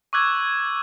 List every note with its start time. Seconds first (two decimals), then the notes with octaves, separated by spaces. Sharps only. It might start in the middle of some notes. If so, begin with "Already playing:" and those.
0.13 C#6 D6 E6 F#6 G#6